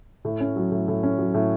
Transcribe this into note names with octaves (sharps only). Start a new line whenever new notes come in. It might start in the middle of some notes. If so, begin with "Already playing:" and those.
A2
C#4
F#3
A2
A2
C#4
F#3
A2